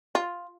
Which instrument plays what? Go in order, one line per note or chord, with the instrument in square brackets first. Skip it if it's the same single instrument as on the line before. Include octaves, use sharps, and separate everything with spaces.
[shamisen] F4